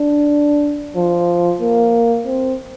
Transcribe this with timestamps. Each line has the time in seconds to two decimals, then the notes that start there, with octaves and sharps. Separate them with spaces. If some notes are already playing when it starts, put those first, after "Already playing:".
Already playing: D4
0.96 F3
1.61 A#3
2.26 C4